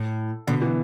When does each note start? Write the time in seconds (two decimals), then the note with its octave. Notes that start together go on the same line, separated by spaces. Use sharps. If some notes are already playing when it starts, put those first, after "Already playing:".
Already playing: A2
0.47 B2 D3
0.62 E3